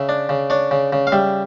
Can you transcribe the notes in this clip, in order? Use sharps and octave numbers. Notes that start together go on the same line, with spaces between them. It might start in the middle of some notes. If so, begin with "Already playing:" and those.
Already playing: C#3 E5
D4
C#3
D4 C#5
C#3
C#3
F5
G3 E5